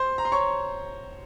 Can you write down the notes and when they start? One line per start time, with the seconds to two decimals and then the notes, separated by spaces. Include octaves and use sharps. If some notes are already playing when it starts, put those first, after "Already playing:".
Already playing: C5 C6
0.18 A#5
0.25 C6
0.32 C#5 C#6